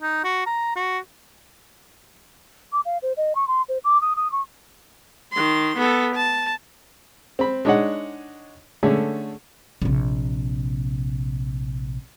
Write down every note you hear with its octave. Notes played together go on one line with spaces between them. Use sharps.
D#4
F#4
A#5
F#4
D6
F5
C5
D#5
C#6
C6
C5
D6
D#6
D#6
C#6
D#3 C6
B3 A4
A5
C4 B5
G#3 D4 D#4 C#5 D#5 F#5
D3 A3 C#4 G#4
A#1 C3